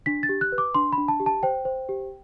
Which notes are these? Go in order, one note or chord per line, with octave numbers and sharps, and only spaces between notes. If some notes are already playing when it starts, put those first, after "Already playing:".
D4 B6
A6
G4
F#6
B4
D6
D4 C6
B5
D4
A5
G4
A5
C5 G5
C5
G4